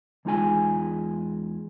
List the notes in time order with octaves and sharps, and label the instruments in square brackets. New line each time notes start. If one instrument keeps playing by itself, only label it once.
[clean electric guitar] E2 G#3 D#4 F4 G#4 G#5